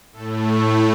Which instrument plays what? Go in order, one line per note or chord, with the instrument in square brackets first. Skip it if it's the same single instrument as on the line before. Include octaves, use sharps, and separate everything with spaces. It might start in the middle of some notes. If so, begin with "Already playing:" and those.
[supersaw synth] A2 A3 A4